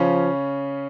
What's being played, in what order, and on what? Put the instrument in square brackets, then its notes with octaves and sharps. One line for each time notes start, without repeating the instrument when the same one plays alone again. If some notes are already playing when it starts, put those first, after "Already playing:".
Already playing: [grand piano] C#3 C#4 [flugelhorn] F3